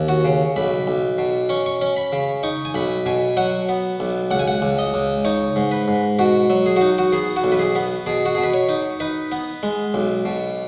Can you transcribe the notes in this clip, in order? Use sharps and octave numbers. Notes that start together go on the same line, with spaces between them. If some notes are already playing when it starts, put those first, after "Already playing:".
Already playing: D#2
F#4
C#3
B1 B5
B1
B2
C#4 C#6
C#6
C#4
B5
C#3
D#4 C#6
G#5
B1 B5
B2 G#5
F#3 F#5
B3
B1
C#2 F#5
G#5
F#5
C#2
D#5
C#2
D#4 C#5
G#2
B4
G#2
B2 F#4
F#3
G#4
D#4 F#4
F#4
B3 G#4
F#4
B1
B4
G#4
B3
B2 G#4
F#4
B2 G#4
B4
C#5
D#4
D#4 B4
B3
G#3
B1
B2